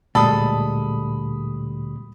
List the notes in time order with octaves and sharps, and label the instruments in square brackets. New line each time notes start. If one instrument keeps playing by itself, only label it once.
[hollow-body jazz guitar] D2 G3 G#3 [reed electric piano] A#2 [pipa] A4 [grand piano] B5 D#6